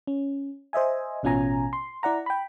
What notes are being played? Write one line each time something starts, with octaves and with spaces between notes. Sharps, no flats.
C#4
C5 D#5 E5 G#5
A1 B2 C#4 F4 G#5 A#5
C6
E4 D5 F#5 A#5
G5 B5